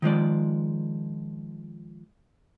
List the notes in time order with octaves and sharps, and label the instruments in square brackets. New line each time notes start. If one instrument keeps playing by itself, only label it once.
[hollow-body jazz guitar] D#3 F3 G#3 D5